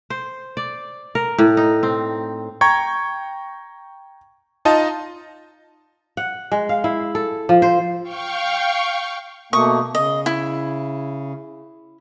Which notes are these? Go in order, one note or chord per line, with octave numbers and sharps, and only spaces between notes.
C5
D5
A#4
A2
D#4
C4
G5 A#5 C#6 G#6
D#4 F4 D#5 A5
F#5
G#3
F5
E4
A4
F3
C5
F5 G5 C#6
B2 A3 A#3 C#6 D#6
C#3 D#5
E4